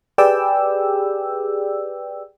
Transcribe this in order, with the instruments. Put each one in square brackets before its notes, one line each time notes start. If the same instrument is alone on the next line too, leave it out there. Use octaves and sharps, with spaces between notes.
[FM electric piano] G4 G#4 B4 D5 G5 E6